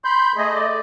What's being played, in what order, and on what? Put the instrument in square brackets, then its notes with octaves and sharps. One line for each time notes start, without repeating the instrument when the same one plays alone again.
[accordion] B5 G6 [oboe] C6
[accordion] A3 D#5 [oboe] G#4
[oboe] D5